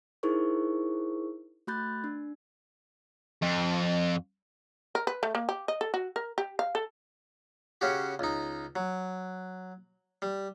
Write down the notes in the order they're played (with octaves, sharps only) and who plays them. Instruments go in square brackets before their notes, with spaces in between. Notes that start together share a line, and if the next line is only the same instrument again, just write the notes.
[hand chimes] D#4 E4 G#4 A#4 C5 C#6
A3 F#4 B5 F#6 G6 A6
D4
[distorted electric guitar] F2
[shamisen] A#4
B4
A3
A#3
G4
D#5
A4
F#4
A#4
G4
F5
A4
[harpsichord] C#3 C#4 F#4 G4
C#2 D#4
F#3
G3